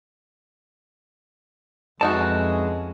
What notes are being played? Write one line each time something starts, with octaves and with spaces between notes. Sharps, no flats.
F2 E3 G#3 C#4 D#4 F#4 A5